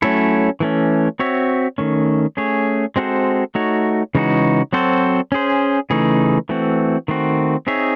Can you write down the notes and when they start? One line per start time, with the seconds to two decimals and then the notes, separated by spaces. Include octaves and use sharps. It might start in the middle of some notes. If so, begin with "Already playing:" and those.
0.02 F#3 A3 C#4 E4 A4
0.60 E3 A3 C#4
1.19 C4 F#4 C#5 E5
1.78 D#3 A3 C#4
2.37 A3 C#4 G#4 C#5
2.96 G#3 C4 F#4 A4 C5
3.55 A3 D#4 F#4 C#5
4.15 C#3 E3 G#3 D#4 F#4
4.73 F#3 C4 F#4 A4 C5
5.32 C#4 G#4 C5
5.90 C#3 E3 A3 D#4 G#4
6.49 E3 A3 C4 F#4
7.08 D#3 A3 C4 F#4
7.67 C4 D#4 G#4 C#5 E5